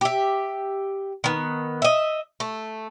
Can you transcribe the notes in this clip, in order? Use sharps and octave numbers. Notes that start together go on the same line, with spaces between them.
G4 E5
D#3 B3
D#5 E5
A3